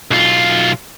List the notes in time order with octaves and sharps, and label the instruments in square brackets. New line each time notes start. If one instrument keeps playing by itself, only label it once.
[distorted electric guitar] B1 F4